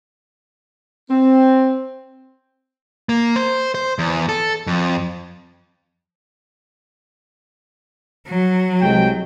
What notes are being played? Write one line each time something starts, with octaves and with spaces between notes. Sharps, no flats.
C4
A#3
C5
C5
E2
A4
F2
F#3
C2 G#3 G5